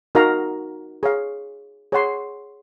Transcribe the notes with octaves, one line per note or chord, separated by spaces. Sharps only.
D#4 F#4 A#4 F5 A#5
G#4 C#5 F5
G#4 C#5 F#5 C6